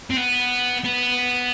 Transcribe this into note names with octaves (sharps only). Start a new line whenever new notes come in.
C4
B3
B3